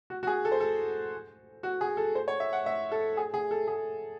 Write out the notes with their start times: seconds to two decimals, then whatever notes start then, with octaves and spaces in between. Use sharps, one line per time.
0.10 F#4
0.23 F#4
0.27 G#4
0.45 A4
0.52 C5
0.60 A4
1.63 F#4
1.81 G#4
1.97 A4
2.15 C5
2.28 C#5
2.40 E5
2.53 F#5
2.66 E5
2.92 A4
3.17 G#4
3.34 G#4
3.51 A4
3.68 G#4